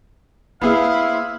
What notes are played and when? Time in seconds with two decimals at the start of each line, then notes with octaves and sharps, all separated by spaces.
0.61 A#3 B3 E4 G#4 C5 F5